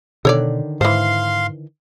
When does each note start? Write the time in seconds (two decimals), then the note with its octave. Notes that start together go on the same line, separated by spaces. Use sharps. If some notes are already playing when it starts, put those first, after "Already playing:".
0.25 B2 D3 D#3 A4 C#5 D5
0.81 G#2 E3 C5 F5 C6